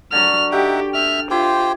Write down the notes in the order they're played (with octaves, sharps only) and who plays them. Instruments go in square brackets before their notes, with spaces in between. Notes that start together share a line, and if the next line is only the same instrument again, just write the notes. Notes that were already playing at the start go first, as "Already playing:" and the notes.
[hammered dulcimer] D3 F#3 [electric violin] F6
[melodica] D#4 E5 F#5 [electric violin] G4 [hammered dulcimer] G5
[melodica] E5 [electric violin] F6
[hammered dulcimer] E4 [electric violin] F4 [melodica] G4 C5 G5